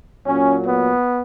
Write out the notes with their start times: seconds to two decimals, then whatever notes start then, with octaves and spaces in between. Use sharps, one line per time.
0.26 A#2 F#3 C#4
0.67 B3